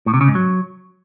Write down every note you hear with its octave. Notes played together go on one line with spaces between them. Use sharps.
A2
C3
C#3
G#2
F#3